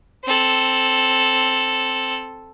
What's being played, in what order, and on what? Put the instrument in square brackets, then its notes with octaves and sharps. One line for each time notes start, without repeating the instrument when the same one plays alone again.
[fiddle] C4 A4